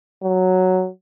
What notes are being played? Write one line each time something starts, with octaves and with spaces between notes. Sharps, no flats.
F#3